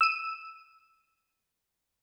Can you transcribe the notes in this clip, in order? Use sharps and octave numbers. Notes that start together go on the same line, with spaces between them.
E6 D#7